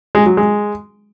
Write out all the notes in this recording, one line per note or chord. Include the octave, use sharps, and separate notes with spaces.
G#3
F#3
G#3